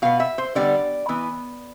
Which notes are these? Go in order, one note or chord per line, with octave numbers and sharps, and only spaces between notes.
B2 B3 F5
E5
C5
D3 G3 B3 D5
E3 B3